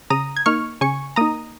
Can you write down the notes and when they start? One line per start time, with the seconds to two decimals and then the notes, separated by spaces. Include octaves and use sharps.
0.10 C#3 A#5 D#6
0.37 G#6
0.46 A#3 D#4 C#6 F6
0.81 C#3 G#5 C#6
1.16 A#3 D#4 A#5 D#6